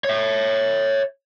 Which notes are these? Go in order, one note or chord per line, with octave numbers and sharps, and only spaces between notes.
C#5 E5